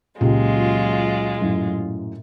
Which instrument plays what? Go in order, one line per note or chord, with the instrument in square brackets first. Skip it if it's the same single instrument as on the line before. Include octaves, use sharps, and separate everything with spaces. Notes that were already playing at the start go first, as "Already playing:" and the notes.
[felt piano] C#2 G4 [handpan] A#2 [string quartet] F#3 G#3 F4
[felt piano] F#2 A2